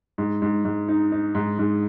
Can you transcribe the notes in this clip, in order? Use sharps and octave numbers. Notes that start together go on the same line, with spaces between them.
G#2
G#2
G#2
D#4
D#4
G#2
G#2